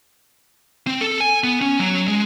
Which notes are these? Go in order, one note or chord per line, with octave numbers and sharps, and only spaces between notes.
C4
A4
G#5
B3
C#4
F#3
G#3